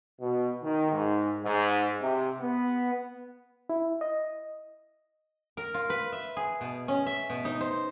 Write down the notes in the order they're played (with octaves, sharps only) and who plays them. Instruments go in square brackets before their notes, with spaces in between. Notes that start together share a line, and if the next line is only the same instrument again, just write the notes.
[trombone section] B2
D#3
G#2
G#2
C3
B3
[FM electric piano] E4
D#5
[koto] A#4
F4
B4
E5
G#4
B2
C#4
E5
B2
D#4
C5